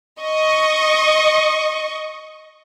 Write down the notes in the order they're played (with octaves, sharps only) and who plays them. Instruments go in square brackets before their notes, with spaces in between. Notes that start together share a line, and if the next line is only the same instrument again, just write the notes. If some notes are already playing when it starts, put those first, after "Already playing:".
[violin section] D#5 C#6